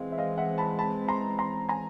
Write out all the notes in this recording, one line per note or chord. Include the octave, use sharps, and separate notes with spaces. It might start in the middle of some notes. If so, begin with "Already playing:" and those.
Already playing: E3 G#3 C4 D#5 F5
E5
D#5 F5
E5 F#5
A5 B5
A5 B5
A#5 C6
A#5 C6
G#5 A#5